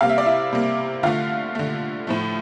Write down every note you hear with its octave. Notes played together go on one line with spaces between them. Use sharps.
C3 G3 A#3 F5
E5
D5
E4 E5
C3 G3 A#3
D3 A3 F4 F5
D3 A3
A2 F3 A3